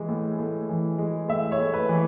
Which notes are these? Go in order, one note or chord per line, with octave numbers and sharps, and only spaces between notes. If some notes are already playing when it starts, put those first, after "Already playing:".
Already playing: E3 G#3
A2
A2
E3
G#3
A2 E5
C#5
A2
B4
E3